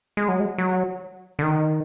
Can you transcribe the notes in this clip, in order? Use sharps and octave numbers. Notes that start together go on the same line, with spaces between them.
G#3
F#3
G#3
F#3
D3
D#3